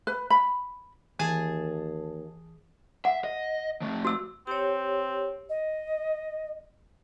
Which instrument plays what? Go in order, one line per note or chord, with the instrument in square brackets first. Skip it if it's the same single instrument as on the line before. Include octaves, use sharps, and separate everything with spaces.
[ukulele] B4
B5
[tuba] D#2 [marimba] E3 [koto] G#4 G#5 A5
[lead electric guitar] E5 [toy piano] F#5
[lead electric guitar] D#5
F3 A3
[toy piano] F#4 E6
[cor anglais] C4 [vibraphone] G4 C#5
[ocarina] D#5